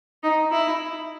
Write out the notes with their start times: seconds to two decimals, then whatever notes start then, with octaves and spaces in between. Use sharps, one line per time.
0.23 D#4
0.51 E4